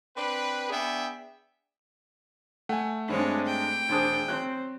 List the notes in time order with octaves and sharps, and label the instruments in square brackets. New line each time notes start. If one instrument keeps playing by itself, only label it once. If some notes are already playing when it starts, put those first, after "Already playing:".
[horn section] C4 D4 B4
B3 D4 G#4 E5 G5
[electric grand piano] A3 [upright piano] F#5 G#5
[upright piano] G2 [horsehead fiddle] G#3 D4 [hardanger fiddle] C4 C#5
[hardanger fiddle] G5
[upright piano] E1 C5 D#6 [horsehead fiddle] D4 G#4
[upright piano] F#3 F#6 [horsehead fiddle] C4